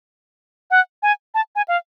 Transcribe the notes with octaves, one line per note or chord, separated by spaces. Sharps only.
F#5
G#5
A5
G#5
F5